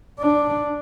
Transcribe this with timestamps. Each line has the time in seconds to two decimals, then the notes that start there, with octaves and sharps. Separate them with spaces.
0.19 D4